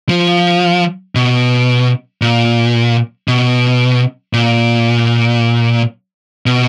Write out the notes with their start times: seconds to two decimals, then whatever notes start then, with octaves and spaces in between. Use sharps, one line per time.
0.09 F3
1.15 B2
2.22 A#2
3.28 B2
4.33 A#2
6.46 B2